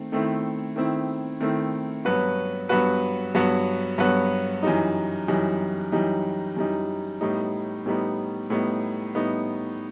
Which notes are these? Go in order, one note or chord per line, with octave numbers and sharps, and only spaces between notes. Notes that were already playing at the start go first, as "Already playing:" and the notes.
Already playing: D#3 A3 C4
D#3 A3 C4 E4
D#3 A3 C4 E4
D#3 A3 C4 E4
G2 F#3 B3 F#4 B4
G2 F#3 B3 F#4 B4
G2 F#3 B3 F#4 B4
G2 F#3 B3 F#4 B4
F#2 E3 G3 D#4
F#2 E3 G3 D#4
F#2 E3 G3 D#4
F#2 E3 G3 D#4
A2 G3 B3 D#4
A2 G3 B3 D#4
A2 G3 B3 D#4
A2 G3 B3 D#4